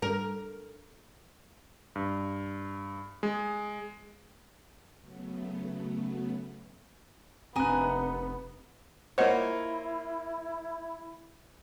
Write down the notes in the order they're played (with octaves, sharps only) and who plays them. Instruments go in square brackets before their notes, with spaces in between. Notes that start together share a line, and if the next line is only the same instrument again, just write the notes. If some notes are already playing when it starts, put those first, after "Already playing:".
[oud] A#4
[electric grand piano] G2
G#3
[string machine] C#3 F#3 A3 B3
[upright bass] F1 D4 [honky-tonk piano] C3 F#6 [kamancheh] B3 [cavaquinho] A#4 G#5 D#6
[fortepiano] A#3 F4 C#5 [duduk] E4 [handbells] C5 D#5 F#5